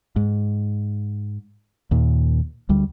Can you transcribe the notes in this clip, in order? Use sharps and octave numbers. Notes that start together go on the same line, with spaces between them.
G#2
D#2 A#2
D2 G3